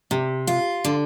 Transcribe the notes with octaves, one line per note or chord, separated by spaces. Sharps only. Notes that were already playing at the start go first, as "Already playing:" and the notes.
C3
F4
D3